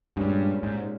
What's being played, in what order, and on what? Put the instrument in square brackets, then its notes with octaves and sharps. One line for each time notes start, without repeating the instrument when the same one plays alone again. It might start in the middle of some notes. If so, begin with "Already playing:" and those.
[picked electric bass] G2 [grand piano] A#2 G#3 C#4 G4
[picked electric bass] G#2